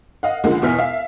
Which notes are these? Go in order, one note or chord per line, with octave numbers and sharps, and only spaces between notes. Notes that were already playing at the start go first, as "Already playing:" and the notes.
D#5 F5 F#5
C#2 D3 F3 G#3 A#3 F#5
E2 B2 E4 G#5 F6 B6
E5 F5